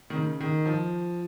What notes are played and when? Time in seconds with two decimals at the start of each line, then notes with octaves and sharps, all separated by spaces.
0.10 D#3
0.15 C#3
0.41 D#3
0.66 F3